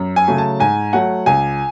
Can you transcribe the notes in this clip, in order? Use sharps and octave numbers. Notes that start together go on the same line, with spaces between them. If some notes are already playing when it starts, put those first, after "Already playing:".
Already playing: F#2
G#5
C#3 F#3 A3
A5
G#2 G#5
F#3 A3 F#5
C#2 G#5